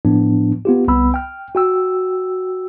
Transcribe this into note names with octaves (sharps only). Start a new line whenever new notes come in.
A2 F3 B3 D4
B3 F4 G4
C2 B3 B5 E6
G5 F6
F#4 G5 E6